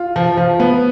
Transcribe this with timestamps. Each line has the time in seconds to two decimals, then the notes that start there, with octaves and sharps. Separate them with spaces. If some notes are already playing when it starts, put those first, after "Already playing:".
Already playing: F4
0.16 F3
0.37 F3
0.60 B3